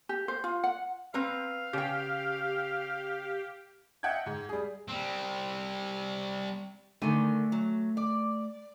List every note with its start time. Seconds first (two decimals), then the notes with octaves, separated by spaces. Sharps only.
0.09 G4
0.28 C5
0.44 F4
0.64 F#5
1.14 C4 B4 F5 A#5
1.73 C#3 G4 G5
4.03 D#5 E5 F#5 G5 G6 G#6
4.26 G#2
4.49 G3 G#4
4.88 G3 C4
7.02 D3 D#3 A3 G#5
7.52 F#3
7.97 D5